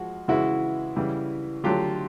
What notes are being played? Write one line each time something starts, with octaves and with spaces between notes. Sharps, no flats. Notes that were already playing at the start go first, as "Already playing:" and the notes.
Already playing: F3 G#3 F#4
C#3 E3 G#3 E4 F#4
C#3 E3 G3
D3 F#3 A3 F4 G4